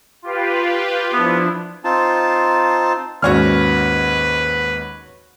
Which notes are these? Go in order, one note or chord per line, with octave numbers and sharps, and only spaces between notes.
F4 G4 B4
F3 B3 D4 E4
C4 D#4 F4 A5
D#2 G#2 C#4 F#4 B4 C#5 F6